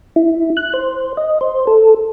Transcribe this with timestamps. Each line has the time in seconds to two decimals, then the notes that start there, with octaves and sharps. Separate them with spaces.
0.16 E4
0.57 F#6
0.74 C5
1.17 D#5
1.41 C5
1.67 A4